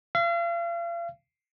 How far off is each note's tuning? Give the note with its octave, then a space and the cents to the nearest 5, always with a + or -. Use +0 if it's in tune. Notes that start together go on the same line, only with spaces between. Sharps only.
F5 -40